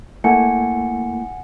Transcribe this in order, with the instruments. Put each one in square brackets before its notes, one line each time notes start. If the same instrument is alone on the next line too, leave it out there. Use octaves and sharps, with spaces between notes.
[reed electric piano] A3 A#3 E4 [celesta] F#5 G#5 C#7